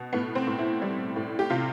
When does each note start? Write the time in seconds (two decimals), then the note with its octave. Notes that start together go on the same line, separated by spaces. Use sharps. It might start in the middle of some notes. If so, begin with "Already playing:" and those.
Already playing: B2
0.13 A2 B3
0.35 C4
0.47 A2
0.58 E4
0.82 G3
1.16 A2
1.39 G4
1.50 C3 F4